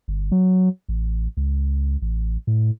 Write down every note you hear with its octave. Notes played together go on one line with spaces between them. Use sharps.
G1
F#3
A1
C#2
A1
A2